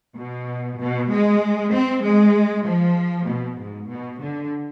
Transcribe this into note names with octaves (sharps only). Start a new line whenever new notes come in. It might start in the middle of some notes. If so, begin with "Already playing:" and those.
B2
B2
G#3
C4
G#3
F3
B2
G#2
B2
D3